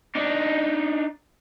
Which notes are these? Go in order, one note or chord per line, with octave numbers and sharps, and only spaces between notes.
D4 D#4